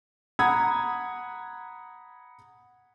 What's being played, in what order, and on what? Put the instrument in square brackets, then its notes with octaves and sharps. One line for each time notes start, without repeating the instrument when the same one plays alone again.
[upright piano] F#5 A#5 B5 D#6 G#6